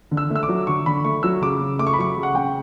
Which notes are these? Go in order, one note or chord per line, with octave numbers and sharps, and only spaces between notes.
D3
E6
A3
E6
D6
F#3
D3 C#6
D3 B5
A3 C#6
F#3 E6
C#3 D6
C#3
A3 D6
C#6
B5
F#3 C#6
C#3
F#5
C#3 G5